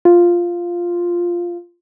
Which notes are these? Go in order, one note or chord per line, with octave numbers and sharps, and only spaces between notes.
F4